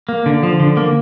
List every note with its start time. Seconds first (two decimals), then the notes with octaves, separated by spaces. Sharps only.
0.09 A#3
0.26 D3
0.43 F3
0.60 D3
0.77 A#3